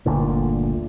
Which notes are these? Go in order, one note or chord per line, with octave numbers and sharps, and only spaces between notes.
G1 D2 A#2 D3